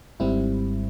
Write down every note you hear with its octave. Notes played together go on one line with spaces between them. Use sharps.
G#1 G#2 G3 C4 E4